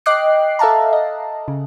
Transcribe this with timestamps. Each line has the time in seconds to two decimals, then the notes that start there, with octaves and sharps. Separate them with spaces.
0.06 D#5 G5 D6 F#6 C7
0.59 A4 E5 F5 A5 A#5
0.93 D#5
1.48 C#3